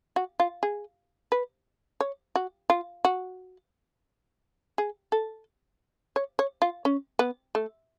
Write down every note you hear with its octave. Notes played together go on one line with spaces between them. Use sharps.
F#4
F4
G#4
B4
C#5
F#4
F4
F#4
G#4
A4
C#5
C#5
F4
C#4
B3
A3